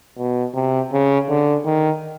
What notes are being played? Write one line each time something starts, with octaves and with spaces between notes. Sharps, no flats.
B2
C3
C#3
D3
D#3